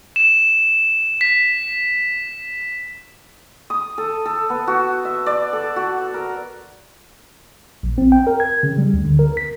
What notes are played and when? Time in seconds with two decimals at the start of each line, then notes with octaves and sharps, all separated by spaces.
0.16 E7
1.21 B6
3.70 D#6
3.98 A4
4.25 A4
4.50 B3
4.67 F#4
5.05 E5
5.26 D5
5.53 A4
5.76 F#4
6.14 A#4
7.83 A#1
7.98 C4
8.12 G5
8.27 A#4
8.40 G#6
8.63 C#3
8.78 G3
8.94 D2
9.05 D3
9.19 A#4
9.37 B6